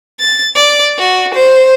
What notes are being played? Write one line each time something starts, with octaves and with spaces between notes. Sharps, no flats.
A6
D5
F#4
C5